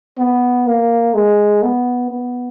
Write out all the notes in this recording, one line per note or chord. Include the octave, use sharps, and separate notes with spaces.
B3
A#3
G#3
B3
B3